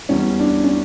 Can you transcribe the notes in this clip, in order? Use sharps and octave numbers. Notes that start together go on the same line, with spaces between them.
E2 E3 G3 C#4
D4
C#4